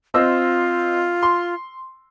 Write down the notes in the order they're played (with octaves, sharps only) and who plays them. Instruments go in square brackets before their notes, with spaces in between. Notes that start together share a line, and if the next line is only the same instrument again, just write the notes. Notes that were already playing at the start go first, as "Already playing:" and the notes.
[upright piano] C4 D#5 E6 [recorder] F4
[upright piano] C6